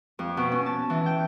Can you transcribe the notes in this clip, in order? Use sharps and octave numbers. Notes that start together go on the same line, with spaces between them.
F2
B2
C#4
A5
E3
G5